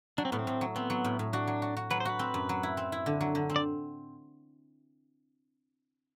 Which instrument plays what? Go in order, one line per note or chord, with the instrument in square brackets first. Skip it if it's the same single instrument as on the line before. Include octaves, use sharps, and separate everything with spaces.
[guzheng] F#3 [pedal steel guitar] D4
[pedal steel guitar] C4
[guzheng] A2 [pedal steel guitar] B3
[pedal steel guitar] C4
[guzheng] A2
F#3
[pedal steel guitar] B3 [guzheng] C4
[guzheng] F#3
A2
A2
[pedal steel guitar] D4 [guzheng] F#4
[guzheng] F#3
F#4
F#4
[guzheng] F#3 [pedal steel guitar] B4
[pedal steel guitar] C5
[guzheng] F#4 [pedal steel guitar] B4
[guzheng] C4
F#2
F#3
E4
C4
E4
D3
F#3
D3
C4
[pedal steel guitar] D5